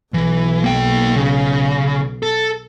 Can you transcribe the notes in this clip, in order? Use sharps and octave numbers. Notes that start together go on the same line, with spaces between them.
B1 E3
A#3 G5
C#3
A4